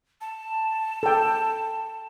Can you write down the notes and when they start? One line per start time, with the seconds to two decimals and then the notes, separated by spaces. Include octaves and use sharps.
0.21 A5
1.03 A4 G5